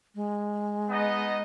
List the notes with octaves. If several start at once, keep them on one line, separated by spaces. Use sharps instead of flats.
G#3
B3 D#4 D#5